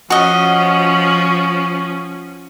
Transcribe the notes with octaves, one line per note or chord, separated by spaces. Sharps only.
F3 C#4 F#4 D#5